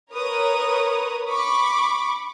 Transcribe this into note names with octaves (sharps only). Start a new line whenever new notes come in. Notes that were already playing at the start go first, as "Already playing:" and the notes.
A#4 B4 C#5 D#6
B5 C#6 D6